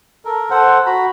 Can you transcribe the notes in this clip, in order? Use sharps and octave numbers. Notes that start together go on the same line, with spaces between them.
A4 A#4
A4 C5 F#5
F#4 A#5 B5